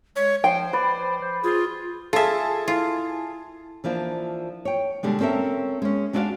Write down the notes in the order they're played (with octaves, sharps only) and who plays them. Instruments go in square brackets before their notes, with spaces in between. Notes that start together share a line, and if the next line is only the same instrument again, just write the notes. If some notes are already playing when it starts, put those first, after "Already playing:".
[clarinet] G#3 [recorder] C#5
[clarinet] F3 [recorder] C5 [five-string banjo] G5
[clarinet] F3 [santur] B4 D5
[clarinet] C5
[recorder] F4 [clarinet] G#4
[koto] F4 E5 [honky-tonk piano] G#4 A4
[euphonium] E4 [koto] F4
[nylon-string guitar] E3 F3 A#3 D4
C#5 G5
B2 D3 G3 G#3
C4 C#4 A4 A#4 E5
G#3 C#4
G#3 D4 E4 F#4 D5 F5